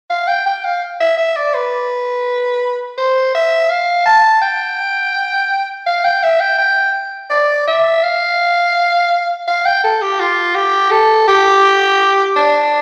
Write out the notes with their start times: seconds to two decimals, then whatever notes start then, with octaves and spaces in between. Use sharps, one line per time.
0.10 F5
0.27 G5
0.46 G5
0.65 F5
1.01 E5
1.18 E5
1.36 D5
1.54 B4
2.98 C5
3.35 E5
3.70 F5
4.06 A5
4.42 G5
5.86 F5
6.04 G5
6.23 E5
6.40 G5
6.58 G5
7.30 D5
7.68 E5
8.03 F5
9.48 F5
9.66 G5
9.84 A4
10.01 G4
10.20 F4
10.55 G4
10.91 A4
11.28 G4
12.36 D4